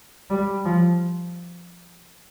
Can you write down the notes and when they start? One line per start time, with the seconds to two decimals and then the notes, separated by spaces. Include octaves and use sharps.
0.30 G3
0.65 F3